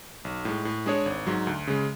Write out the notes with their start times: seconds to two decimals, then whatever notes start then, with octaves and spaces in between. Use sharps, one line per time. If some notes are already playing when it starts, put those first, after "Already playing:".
0.25 B1
0.45 A2 G#3
0.65 A2
0.86 G#3 D4 G#4 C#5
1.06 G#1
1.27 G#2 F#3
1.47 D2
1.67 C#3 G#3